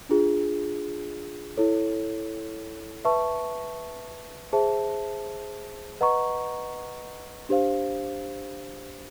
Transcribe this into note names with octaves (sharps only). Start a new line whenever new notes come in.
D4 F4 G#4
E4 A4 C#5
B4 E5 A5 C#6
G#4 C5 E5 A5
B4 D#5 F#5 A#5 C#6
D4 G4 C5 F5